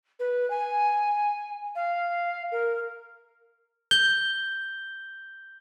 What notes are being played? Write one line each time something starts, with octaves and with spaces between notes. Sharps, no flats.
B4
G#5
F5
A#4
G6 G7